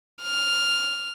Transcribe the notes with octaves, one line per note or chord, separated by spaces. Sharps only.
F6